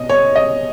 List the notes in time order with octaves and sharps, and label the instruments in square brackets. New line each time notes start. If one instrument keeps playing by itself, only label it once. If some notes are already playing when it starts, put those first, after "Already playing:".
Already playing: [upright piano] B2 D#5
C#5
D#5